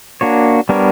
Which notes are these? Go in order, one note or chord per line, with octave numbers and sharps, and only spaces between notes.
A#3 D4 F#4 C#5
G3 B3 D4 A#4 C#5